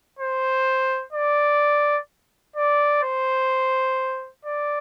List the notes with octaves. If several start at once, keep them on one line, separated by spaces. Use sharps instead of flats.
C5
D5
D5
C5
D5